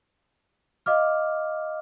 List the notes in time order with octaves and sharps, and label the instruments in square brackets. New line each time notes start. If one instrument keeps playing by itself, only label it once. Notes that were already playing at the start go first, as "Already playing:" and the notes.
[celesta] D#5 F5 D6 F6